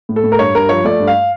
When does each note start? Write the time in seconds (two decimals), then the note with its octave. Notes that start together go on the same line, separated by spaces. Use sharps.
0.09 A2
0.16 A4
0.24 A2
0.32 A#4
0.39 G2 C#5
0.55 G2 A#4
0.69 F3 C#5
0.84 A3 D5
1.00 G2
1.07 F5